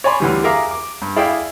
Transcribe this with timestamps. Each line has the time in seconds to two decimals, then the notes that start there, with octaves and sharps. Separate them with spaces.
0.04 C#5 D5 G#5 B5 C6
0.20 D2 E3 G3
0.44 G#4 A#4 E5 F5 A#5 D6
0.71 D6
1.02 G2
1.16 E4 G#4 D5 E5 F5 G5